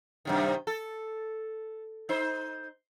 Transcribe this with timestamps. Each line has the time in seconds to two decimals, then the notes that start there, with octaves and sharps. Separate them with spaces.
0.25 F#2 C3 D#3
0.67 A4
2.09 D#4 C5